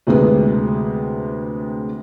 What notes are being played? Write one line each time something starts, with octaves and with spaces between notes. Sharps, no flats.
D2 C3 G#3 B3